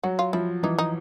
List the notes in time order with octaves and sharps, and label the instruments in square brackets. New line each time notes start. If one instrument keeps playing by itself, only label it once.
[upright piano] F#3 [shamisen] F#4
[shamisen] F4
[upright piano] F3 [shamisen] E4
[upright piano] E3 [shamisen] D#4
[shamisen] D#4